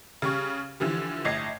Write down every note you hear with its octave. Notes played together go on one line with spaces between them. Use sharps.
C#3 G3 C#6
D3 E3 F3 G3
G1 A2 D#5 G#6 C7